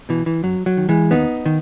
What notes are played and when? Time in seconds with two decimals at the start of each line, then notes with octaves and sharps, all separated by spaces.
0.09 B2 E3
0.26 E3
0.43 F#2 F#3
0.66 F#3
0.77 D#3
0.89 E3 G#3
1.11 D#2 B3 D#4
1.46 D#3